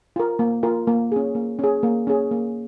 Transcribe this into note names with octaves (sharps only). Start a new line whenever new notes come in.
F4 A#4
A#3
F4 A#4
A#3
C#4 G#4
A#3
C#4 G#4
A#3
C#4 G#4
A#3